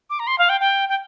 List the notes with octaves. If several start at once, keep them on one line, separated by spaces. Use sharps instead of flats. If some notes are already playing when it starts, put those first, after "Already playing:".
D6
A#5
C6
F5
G5
G5
G5